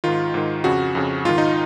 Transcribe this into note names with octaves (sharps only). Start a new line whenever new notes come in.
G#2 D#3 F4
G#2 D#3
F2 C#3 F#4
F2 C#3
G#2 D#3 F4
D#4